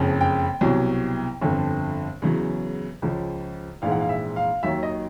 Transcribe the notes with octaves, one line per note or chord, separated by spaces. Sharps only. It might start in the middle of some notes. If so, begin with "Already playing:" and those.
Already playing: F#1 F2 C#3
G5
C2 B2 F#3
G1 F2 D3
E2 C#3 F#3
C#2 C#3 F3 G#3
A#1 G#2 E3 G#3 F5
F#5
F5
E5
F5
D#2 D#3 F#3 E5
D#5